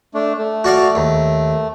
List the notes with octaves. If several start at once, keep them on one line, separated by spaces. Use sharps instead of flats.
A3 D4
A3
F#4 D5 F5
D#2